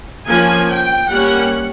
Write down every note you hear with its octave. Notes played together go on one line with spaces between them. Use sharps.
F3 A#3 C#4 G#5
G5
G3 A#3 C#4 F#5